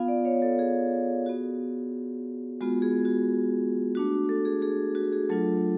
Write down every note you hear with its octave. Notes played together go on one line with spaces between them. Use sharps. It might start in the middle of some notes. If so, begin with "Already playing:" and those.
Already playing: B3 F4 F5
D5
C#5
A4
G#4
B3 F#4
G#3 B3 F4 F#4
G#4
F#4
A3 D4 F#4
A4
G#4
G#4
F#4
G#4
F#3 A3 D4 F4 A4